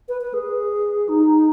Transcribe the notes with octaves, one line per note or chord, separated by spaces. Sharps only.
B4
B4
G#4
D#4